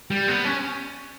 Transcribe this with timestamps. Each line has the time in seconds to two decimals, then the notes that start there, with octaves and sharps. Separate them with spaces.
0.10 G3
0.28 B3
0.45 C#4